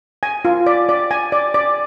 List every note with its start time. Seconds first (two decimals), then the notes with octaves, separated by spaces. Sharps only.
0.23 G#5
0.45 F4
0.67 D5
0.89 D5
1.11 G#5
1.32 D5
1.54 D5